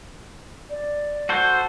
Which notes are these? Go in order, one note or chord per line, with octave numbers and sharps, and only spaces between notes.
D5
F#4 A4 C5